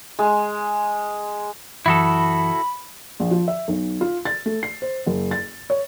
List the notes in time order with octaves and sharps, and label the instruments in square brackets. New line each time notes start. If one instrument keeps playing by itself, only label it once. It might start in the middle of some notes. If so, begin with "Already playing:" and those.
[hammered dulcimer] G#3
[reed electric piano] F#2 E3 D#6 [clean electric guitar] E4 F#4 A4 [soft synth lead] B5
[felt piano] A#1
F3
E5
B1
F4
A6
A3
C7
C5
F#1
A6
C#5